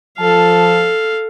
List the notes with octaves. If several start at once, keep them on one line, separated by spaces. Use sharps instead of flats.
F3 A4 F5 A5